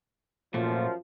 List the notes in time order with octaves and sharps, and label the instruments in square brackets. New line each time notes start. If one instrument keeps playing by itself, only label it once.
[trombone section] F#2 F3 [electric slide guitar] A#2 A3